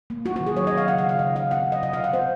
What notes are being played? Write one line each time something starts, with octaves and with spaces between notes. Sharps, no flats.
A#3
A#3 F#4
F#4
D#3
G#4
F#3 C#5
D#5
C4
F5
C#3 F#5
F5
C#3
F5
C#3 D#5
C#3 F5
C4 F#5
F#3
D#5
C3 D#5
F5
C3
F#5
C4 C5